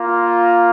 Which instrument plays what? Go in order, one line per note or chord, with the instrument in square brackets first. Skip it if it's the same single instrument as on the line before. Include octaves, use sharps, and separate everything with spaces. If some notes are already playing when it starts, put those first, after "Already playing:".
Already playing: [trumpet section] A#3 F4